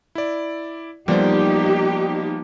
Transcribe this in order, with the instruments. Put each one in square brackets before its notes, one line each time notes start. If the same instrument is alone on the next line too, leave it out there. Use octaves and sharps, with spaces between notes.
[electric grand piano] E4 D5
[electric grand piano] F3 A#3 B3 [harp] G3 C5 [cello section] D#4 G4